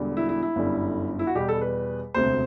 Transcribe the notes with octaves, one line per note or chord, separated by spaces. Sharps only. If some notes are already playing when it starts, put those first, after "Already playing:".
Already playing: E1 E2 D3 G3
E4
E4
E4
G1 F#2 D3 G3
E4
F#4
E2 B2 G3 G4
A4
B4
E1 D2 C3 C5